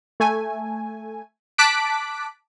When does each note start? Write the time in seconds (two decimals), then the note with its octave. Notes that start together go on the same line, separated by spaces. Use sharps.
0.20 A3 G#5
1.58 A5 D6 F#6 B6 D7